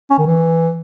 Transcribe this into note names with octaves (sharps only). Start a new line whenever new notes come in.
C#4
D#3
E3